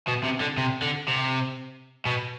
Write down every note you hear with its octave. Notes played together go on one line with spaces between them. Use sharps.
B2
C3
D3
C3
D3
C3
B2